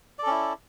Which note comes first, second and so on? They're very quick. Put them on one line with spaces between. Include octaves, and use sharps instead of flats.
D5 A4 C#4 E4